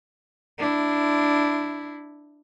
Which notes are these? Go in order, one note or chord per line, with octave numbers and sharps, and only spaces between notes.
D4 E4